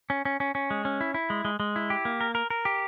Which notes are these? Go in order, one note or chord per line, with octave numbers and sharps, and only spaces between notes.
C#4
C#4
C#4
C#4
G#3
C#4
E4
E4
G#3
G#3
G#3
E4
G4
A#3
A#4
A#4
A#4
G4